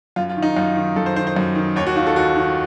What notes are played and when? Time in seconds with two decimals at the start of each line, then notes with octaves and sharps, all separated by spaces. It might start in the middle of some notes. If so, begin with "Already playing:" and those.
0.16 F#2 F4
0.29 F4
0.37 D#3
0.42 D#4
0.57 F#2 F4
0.76 D#3
0.96 F#2 A4
1.06 C5
1.16 D#3 C5
1.27 C5
1.36 F#2
1.56 D#3
1.76 D#2 C#5
1.86 F#4
1.96 D#3 F4
2.07 A4
2.16 D#2 F#4
2.36 D#3